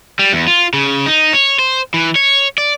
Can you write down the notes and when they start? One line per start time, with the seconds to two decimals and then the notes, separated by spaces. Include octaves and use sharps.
0.19 G3
0.33 E2
0.47 F4
0.74 C#3
1.06 D#4
1.33 C#5
1.59 C5
1.94 E3
2.16 C#5
2.58 D5